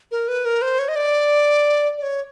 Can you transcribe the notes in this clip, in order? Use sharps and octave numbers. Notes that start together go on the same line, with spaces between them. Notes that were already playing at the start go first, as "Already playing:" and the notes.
A#4
B4
A#4
C5
C#5
D#5
D5
D5
C#5